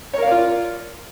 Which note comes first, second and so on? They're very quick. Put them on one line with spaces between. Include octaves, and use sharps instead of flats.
C#5 A#4 F5 D5 F4